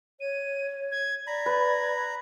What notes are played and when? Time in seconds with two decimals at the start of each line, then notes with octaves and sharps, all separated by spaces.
0.20 C#5 D#7
0.91 G#6
1.27 D5 A#5 B5 G#6
1.46 B4